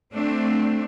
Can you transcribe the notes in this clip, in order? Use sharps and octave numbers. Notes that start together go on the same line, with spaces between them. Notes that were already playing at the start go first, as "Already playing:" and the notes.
A3 C4 D4